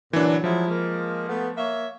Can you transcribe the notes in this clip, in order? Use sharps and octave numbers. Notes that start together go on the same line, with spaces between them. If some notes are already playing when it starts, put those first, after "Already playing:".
A#2 D3 E3 F#3 D4
F3 F#3 G#3 E4
G#3 A#3
A3 B3
A#3 C#5 E5